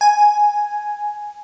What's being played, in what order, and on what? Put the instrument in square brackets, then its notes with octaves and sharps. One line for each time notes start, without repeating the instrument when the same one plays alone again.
[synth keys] G#5